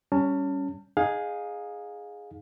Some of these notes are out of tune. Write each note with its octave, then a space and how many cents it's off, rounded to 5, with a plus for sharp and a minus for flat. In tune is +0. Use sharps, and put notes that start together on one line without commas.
G3 +0 C#4 +10 A5 +35
D#4 +0 G#4 +0 F5 +30